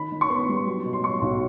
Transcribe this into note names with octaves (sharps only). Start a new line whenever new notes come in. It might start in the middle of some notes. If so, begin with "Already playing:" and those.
Already playing: D#3 B5
D#3
C#6
B3 C6
G3
F#3
B2
C6
F#3 C#6
B1